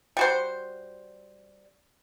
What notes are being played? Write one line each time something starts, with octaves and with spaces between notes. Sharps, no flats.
G3 F#4 C5